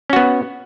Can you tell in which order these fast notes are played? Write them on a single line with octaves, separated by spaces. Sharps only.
C#4 F#4 B3